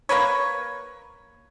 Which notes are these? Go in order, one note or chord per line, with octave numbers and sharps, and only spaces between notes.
A#3 A#4 B4 C#5